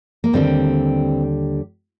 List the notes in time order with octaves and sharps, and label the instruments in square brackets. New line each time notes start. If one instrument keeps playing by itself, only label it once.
[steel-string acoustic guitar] A#3
D#2 D3 G3 C4